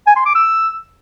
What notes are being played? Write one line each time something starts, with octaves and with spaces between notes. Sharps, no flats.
G#5
C6
D6
E6